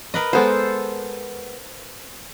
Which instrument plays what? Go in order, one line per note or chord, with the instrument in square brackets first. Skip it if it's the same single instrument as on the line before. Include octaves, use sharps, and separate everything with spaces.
[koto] A#4 B4 D#5
[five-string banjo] G#3 B3 B5 [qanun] A4 C5